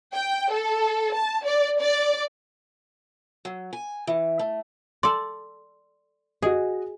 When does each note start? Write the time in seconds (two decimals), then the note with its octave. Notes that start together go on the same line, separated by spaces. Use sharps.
0.13 G5
0.52 A4
1.14 A5
1.45 D5
1.80 D5
3.45 F#3
3.73 G#5
4.07 E3
4.39 A3
5.03 A4 D5 C6
6.42 F#4 G#4 D#5